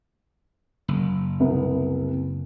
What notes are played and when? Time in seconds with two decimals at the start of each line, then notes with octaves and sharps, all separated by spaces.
0.88 F#1
1.40 C2 C3 B3